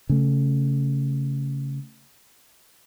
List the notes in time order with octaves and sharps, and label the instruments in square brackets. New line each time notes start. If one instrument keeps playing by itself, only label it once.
[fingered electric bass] C#3 A3